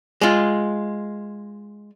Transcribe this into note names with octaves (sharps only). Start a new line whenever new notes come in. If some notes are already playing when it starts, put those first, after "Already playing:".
G#3 F4